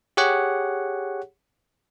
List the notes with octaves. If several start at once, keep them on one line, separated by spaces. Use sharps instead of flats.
G4 G#4 C#5 F#5